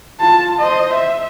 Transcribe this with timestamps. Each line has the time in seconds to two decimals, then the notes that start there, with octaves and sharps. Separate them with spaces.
0.20 F4 A5
0.60 C5 D#5
0.94 E5